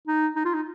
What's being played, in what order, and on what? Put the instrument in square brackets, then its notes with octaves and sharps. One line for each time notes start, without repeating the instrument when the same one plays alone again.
[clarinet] D#4
D#4
F4
D#4